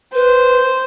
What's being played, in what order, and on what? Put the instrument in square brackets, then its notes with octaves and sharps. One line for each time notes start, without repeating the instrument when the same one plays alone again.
[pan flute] B4 [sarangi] C5